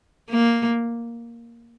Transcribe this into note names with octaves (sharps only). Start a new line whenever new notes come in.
A#3